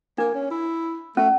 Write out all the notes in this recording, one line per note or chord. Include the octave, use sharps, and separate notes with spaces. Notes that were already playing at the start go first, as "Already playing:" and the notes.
A#3 D4
C#4
E4
A3 C#4